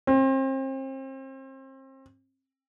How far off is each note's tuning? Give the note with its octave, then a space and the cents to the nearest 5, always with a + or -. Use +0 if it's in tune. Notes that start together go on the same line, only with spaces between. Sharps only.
C4 +35